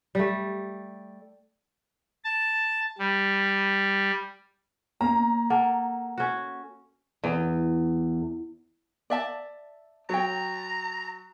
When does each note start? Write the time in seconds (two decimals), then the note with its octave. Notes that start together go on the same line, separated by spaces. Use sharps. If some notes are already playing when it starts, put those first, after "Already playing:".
0.15 G3 A3
2.24 A5
2.98 G3
5.01 A#3 A#5
5.50 A#3 A4 F#5 A5
6.18 C#4 F#4
7.24 E2
9.10 D5 E5 A5
10.09 F#3 C#5 G5 A#5